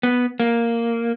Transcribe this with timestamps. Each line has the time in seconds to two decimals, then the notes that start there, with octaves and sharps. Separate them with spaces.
0.03 B3
0.40 A#3